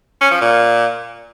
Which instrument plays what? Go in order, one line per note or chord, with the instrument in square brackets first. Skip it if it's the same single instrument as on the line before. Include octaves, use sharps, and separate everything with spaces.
[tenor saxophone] C#4
F3
A#2